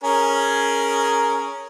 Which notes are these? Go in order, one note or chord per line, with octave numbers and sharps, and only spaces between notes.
C#4 G#4 A#4